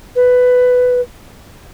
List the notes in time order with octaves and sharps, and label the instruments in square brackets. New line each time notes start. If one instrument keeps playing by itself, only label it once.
[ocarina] B4